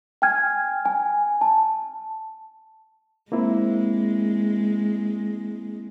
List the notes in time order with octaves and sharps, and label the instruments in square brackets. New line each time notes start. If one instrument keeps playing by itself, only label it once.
[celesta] G5 G#5 F6 G#6
G#5
A5
[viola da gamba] G#3 [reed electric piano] A#3 C4 E4